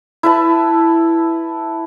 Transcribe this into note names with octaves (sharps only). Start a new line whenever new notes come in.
E4 B4 A5